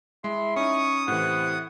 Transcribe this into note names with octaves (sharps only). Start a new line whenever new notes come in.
G#3 E4 C6
C#4 D#4 C#6 D#6
A2 C3 E3 F#5